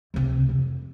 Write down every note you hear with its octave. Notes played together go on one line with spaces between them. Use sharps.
C#2 C3
F2